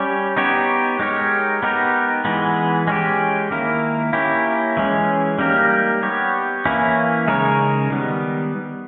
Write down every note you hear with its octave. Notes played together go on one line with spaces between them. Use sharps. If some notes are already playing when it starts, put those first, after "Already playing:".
Already playing: G3 C#4 G4 C#5
B3 D#4 G4 C#5
G#3 D#4 G4 A#4 C#5
B3 D#4 G4 A#4
E3 G#3 B3
G#3 C#4 G4
D#3 A#3 E4 A#4
A#3 C#4 E4 G4
E3 G#3 C#4
G3 A#3 D#4 G4 A#4
B3 G4 C#5
E3 A#3 C#4 E4
C#3 G#3 D#4 A#4 C#5
D#3 G3 B3